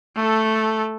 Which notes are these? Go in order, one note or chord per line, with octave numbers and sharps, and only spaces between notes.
A3 A4